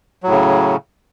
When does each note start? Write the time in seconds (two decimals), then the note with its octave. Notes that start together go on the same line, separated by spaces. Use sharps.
0.23 F#3
0.27 A2
0.31 C#3